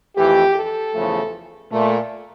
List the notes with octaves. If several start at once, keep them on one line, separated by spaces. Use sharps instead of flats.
F2 E3 A3 G4
A4
E2 C#3 F3 A3
A#2 A3